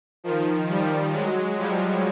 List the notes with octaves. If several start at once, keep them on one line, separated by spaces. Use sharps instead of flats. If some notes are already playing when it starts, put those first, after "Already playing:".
D#3 F3
F3 G3
F#3 G#3
F3 G3